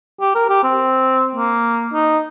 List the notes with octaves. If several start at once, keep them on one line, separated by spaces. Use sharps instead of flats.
G4
A#4
G4
C4
A#3
D#4